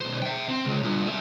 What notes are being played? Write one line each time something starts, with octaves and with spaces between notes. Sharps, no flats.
B1 C5
E5 G5
C4
C#2
G2 A#2
G3 E5